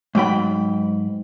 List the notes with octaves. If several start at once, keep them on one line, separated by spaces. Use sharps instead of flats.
G#2 F#3 G5 B5